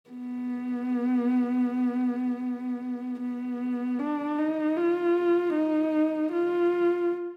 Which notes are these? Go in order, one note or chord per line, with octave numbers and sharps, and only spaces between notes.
B3
B3
D4
D#4
F4
D#4
F4